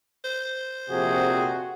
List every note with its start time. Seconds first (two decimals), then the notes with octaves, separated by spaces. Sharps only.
0.24 C5
0.90 A#1 F2 C3 F#4 G#4